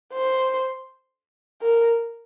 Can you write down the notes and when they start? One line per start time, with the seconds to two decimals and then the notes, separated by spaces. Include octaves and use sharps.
0.13 C5
1.61 A#4